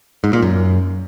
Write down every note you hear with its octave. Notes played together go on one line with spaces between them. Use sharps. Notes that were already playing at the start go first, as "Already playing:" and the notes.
G#2
A#2
F#2